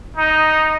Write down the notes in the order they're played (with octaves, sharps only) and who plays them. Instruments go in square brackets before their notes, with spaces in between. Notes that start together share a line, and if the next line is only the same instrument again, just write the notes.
[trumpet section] D#4